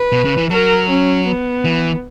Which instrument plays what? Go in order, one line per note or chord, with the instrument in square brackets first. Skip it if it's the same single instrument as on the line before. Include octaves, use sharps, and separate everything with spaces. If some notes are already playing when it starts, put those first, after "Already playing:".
Already playing: [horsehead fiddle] B4
[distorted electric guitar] B2
C#3
E3
[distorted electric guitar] F#3 [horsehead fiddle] A#4
[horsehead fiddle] C#4
B3
[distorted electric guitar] E3